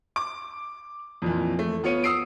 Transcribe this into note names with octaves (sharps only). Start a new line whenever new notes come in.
D6
F2 A#2 E3
A3
B3 F4 C#5 C#7 D#7
D#6 E6 C7 D7